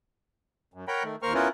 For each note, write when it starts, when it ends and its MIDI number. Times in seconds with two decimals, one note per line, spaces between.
0.74 0.85 42
0.88 1.03 70
0.88 1.03 73
0.88 1.03 78
0.88 1.03 79
0.88 1.03 82
0.88 1.03 83
1.03 1.16 51
1.03 1.16 57
1.22 1.33 39
1.22 1.33 58
1.22 1.33 70
1.22 1.33 72
1.22 1.33 85
1.22 1.33 89
1.34 1.48 59
1.34 1.48 61
1.34 1.48 64
1.34 1.48 65
1.34 1.48 70
1.34 1.48 71